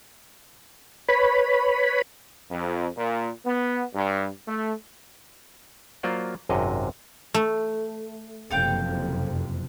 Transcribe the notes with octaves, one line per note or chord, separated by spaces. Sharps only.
B4 C#5 B5
F2
A#2
B3
G2
A3
F#3 A#3 F4 C5 D5
G#1 F#2 C3 D#5
A3
F#1 F2 C3 A4 F5 G5